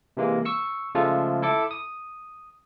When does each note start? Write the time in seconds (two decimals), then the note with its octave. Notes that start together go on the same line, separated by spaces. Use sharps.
0.17 C3 E3 G#3 A#3
0.45 C#6 E6 C#7
0.95 C#3 F3 G#3 A3 F4 A4
1.42 E4 A4 D6
1.71 D#6